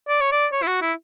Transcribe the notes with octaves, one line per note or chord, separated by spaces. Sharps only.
D5
C#5
D5
C#5
E4
F#4
E4